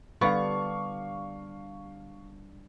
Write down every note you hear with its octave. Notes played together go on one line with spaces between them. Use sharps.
D3 G3 B3 D4 F5 C#6